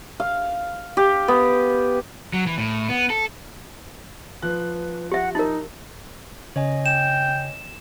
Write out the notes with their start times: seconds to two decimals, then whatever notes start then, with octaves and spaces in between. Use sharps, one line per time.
0.20 F5
0.97 G4
1.28 B3
2.33 F#3
2.46 E3
2.58 A2
2.89 B3
3.10 A4
4.42 F3 B4 F#6
5.12 G4 E5 F#5
5.35 D#4 E4 A#4
6.56 C#3 C#5 D#5 G#5
6.86 G5 E7